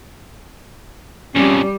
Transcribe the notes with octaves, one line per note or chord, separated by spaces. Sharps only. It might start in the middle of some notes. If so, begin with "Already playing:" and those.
F2 C#3 G3 C#4